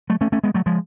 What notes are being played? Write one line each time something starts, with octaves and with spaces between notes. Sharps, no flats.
F#3 A3
A3 C#4
A3 C#4
G#3 B3
F#3 A3
F3 G#3